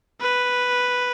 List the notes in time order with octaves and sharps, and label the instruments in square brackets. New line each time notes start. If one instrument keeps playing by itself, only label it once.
[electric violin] B4